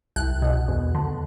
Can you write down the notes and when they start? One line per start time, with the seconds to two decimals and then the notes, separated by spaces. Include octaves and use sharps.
0.16 C2 F#6
0.42 B2
0.68 E2
0.95 D3